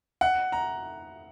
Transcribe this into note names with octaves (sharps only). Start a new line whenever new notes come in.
F#5
A#5